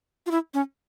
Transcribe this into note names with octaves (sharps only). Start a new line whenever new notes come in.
F4
E4
C#4